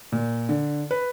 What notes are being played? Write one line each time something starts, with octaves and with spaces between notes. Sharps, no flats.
A#2
D3
B4